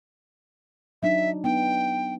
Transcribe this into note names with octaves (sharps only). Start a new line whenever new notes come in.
F#3 D4 D#4 E5
B3 D4 D#4 G5